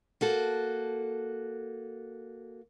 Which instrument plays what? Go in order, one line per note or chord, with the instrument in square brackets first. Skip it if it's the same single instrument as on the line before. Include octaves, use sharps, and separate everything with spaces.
[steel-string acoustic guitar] A#3 F#4 A4